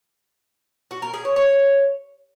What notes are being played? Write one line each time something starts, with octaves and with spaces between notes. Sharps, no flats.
F#4
A#4
G#4
C#5
C#5